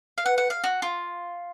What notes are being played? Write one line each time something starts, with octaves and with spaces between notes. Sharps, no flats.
F5
B4 F#5
F#5
F5
F#4
F4